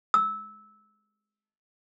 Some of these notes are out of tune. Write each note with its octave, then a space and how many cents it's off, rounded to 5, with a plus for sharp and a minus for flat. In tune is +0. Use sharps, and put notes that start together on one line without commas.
E6 -15